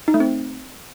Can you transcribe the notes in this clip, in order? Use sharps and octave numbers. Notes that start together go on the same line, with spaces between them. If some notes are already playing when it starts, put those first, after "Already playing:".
D#4
A3
C4